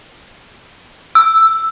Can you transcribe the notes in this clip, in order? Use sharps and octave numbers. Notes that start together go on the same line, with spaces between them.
E6